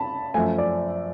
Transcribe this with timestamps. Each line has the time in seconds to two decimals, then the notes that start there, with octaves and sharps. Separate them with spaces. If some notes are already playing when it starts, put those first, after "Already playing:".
Already playing: A5 B5
0.34 F#2 F3 A3 G#5
0.58 D5